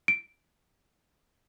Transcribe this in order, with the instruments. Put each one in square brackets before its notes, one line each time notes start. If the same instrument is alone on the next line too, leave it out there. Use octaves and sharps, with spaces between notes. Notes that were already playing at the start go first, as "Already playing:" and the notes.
[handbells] D7